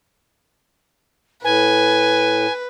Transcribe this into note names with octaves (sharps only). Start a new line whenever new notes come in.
A2 B4 G#5